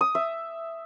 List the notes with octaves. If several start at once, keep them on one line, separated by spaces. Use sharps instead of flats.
D#6
E5